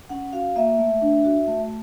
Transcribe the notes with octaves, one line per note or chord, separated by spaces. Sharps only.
C#4 F#5
F#4 F5
A#3 E5
A3
D4
F#4
A3